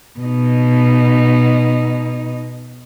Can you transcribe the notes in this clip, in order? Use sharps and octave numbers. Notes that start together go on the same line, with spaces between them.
B2 D#4